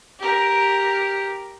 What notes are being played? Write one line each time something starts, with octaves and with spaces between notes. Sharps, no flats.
G4 A#4